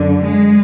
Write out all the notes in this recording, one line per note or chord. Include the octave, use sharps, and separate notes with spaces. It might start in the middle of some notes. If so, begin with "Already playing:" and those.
Already playing: F#2 D3
G#3